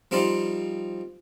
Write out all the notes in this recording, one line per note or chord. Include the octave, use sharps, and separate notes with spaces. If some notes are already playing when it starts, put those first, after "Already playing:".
F3 G3 C4 D#4 F4 D5